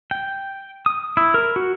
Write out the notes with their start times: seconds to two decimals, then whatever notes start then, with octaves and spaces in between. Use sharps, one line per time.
0.11 G5
0.86 D#6
1.17 E4
1.34 A#4
1.56 F#4